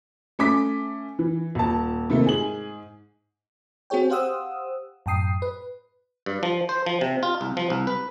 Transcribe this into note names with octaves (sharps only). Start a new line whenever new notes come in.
A3 C#4 D6 B6
E3
D#1 A5
C3 D#3 A3 A#3
G#2 G#4 F#7
C4 F#4 G#4 C#5 G5
G4 C5 F5 F#5 D#6 E6
F#2 A2 G5 D#6 C7
B4
G2
F3
C5
F3
C3
F4
C2
F3
C2
B4